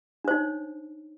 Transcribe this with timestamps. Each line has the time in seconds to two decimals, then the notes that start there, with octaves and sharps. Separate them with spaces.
0.24 D4
0.28 C5
0.31 D#4
0.34 C#5